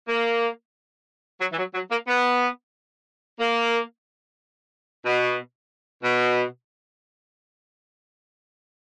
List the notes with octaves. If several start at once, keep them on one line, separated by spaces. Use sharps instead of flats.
A#3
F#3
E3
F#3
F#3
A#3
B3
A#3
B2
B2